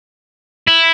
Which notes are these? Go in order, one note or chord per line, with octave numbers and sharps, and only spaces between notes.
E4